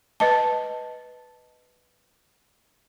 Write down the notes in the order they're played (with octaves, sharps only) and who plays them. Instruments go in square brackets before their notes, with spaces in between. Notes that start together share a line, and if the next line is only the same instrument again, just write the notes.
[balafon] B4 D#5 A5